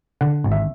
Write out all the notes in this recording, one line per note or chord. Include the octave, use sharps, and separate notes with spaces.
D3 F#5
G#1
E5